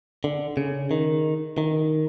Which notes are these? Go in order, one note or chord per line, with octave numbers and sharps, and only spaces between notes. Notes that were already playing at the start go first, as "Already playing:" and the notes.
D3
C#3
D#3
D#3